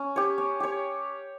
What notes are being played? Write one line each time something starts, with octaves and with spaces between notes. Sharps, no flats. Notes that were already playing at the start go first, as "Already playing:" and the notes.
Already playing: C#4
G4 C#5
C#4
G4 C#5